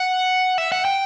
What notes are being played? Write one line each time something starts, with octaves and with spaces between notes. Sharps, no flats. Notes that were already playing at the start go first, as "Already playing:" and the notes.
Already playing: F#5
E5
F#5
G5